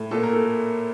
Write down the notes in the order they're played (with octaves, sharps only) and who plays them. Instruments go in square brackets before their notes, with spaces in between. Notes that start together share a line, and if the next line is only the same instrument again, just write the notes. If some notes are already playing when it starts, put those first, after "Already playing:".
Already playing: [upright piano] A2
A#2 A4
A#4
A4